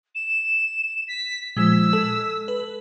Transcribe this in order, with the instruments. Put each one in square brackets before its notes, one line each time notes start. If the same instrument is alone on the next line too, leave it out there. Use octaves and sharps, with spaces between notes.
[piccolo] E7
B6
[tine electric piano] A#2 F3 [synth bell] G#3 B6 [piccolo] E6
[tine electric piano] A4
[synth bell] B4